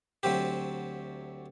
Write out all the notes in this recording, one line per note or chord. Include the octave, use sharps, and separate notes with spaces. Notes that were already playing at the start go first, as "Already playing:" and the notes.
D2 F#3 C4 G4